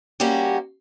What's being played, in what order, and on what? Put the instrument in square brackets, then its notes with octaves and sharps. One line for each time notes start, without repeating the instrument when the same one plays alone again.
[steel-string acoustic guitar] G3 A#3 C#4 F#4 G4